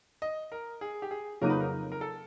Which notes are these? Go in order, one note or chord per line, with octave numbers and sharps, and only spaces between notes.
D#5
A#4
G#4
G4
G#4
F2 C#3 F#3 A#3 D#4 A#4
B4
A#4
A#4
A4